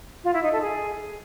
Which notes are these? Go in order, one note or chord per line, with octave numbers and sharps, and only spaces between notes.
F4
E4
D#4
A4
G#4